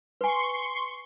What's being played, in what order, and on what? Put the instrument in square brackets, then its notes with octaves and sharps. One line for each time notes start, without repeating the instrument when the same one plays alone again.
[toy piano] B4 G#5 [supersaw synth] C6 C#6